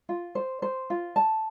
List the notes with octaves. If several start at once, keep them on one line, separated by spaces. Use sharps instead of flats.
F4
C5
C5
F4
A5